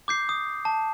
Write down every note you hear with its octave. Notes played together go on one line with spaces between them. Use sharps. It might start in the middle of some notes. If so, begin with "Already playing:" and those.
D6 G6 C7
D#6
A5